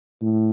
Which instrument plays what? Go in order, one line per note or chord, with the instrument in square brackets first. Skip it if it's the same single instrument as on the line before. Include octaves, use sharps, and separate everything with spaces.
[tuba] A2